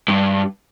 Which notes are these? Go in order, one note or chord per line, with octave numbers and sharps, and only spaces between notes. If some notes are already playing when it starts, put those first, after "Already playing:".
G2